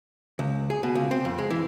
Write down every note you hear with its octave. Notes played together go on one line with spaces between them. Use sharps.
C#2
G#4
B2
C#2
C4
F2
G#3
E3